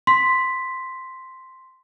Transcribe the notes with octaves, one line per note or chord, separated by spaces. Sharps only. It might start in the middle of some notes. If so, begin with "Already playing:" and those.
C6 B6